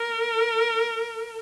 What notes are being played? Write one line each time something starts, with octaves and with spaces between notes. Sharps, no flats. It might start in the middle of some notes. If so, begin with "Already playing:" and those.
Already playing: A#4